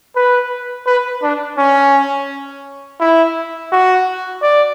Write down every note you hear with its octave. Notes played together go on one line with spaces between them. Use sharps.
B4
B4
D4
C#4
E4
F#4
D5